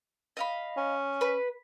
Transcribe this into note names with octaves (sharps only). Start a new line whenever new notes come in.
D#5 F5 B5
C#4
B4